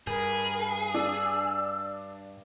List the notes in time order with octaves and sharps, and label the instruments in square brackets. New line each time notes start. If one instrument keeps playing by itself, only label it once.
[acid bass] G2 [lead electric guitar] G#4 [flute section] A#4 B5
[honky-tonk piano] D4 [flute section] E6